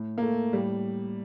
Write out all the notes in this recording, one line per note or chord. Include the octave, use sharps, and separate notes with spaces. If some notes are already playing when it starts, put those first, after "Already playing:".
Already playing: A2
A#3
A3
A2 G3